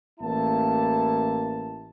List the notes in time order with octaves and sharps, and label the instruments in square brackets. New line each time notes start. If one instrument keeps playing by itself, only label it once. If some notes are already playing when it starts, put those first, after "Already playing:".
[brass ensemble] A1 A#3 E4 A5